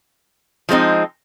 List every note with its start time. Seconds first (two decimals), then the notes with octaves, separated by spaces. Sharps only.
0.69 F3 G#3 C4 D#4